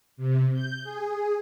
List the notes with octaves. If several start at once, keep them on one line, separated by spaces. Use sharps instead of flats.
C3
G6
G#4